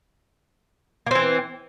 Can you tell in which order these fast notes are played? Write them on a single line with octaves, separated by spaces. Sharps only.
A#3 C4 E3